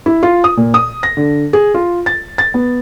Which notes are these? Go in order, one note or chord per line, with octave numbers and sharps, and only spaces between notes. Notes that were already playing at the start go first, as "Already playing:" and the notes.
E4
F4
D#6
A#2
D#6
A#6
D3
G#4
F4
A6
A6
B3